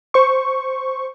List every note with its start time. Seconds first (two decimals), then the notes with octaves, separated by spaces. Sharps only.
0.14 C5 C#6